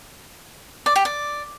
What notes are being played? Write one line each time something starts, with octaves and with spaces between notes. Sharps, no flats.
D5
G4
D5